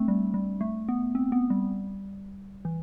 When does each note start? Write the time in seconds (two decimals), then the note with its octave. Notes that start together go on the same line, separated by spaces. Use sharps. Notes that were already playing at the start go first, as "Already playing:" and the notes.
Already playing: A3 C4 D4
0.08 G3
0.34 G3
0.61 A3
0.89 B3
1.15 C4
1.32 B3
1.50 G3
2.65 E3